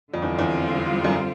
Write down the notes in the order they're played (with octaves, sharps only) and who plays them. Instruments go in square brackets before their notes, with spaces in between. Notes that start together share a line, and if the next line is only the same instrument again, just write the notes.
[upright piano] F2 [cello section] D3 G3 C4 F4
[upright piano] E2
E2
F#2